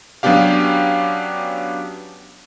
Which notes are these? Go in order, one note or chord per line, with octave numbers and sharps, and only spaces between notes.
F#3 B3 C#4 D4 G4 F5